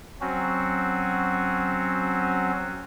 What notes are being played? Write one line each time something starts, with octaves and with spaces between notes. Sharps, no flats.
F#3 C4 C#4 F#4